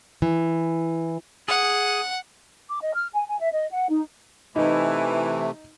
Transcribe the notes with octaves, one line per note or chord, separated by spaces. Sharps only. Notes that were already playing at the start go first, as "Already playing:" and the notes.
E3
G#4 F#5
D6
D#5
F6
G#5
G#5
E5
D#5
F#5
D#4
C3 E3 A3 D#4